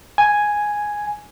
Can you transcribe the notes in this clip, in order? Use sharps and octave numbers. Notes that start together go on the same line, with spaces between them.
G#5